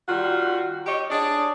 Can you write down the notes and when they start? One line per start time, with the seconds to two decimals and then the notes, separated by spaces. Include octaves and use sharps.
0.09 D#3 G3 F4 F#4
0.86 G4 C#5 D#5
1.10 D4 G#4 C#5 D5